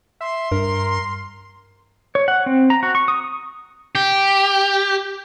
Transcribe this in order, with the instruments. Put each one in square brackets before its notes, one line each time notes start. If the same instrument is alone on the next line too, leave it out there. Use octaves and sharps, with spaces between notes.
[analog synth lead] E5 [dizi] C6
[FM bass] G2 [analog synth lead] A#4
[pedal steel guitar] C#5
F#5
C4
A#5
F#4
C#6
D#6
[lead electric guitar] G4